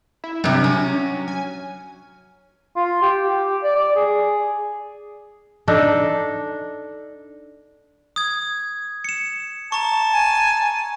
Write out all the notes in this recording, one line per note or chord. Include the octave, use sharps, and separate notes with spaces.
E4
G2 C3 F#3
C#4
G#5
F4
G4
G4
D5
D5
G#4
D4 D#4 A4
D#6 G#6
C#7 E7
A5 A#5 C#6
G#5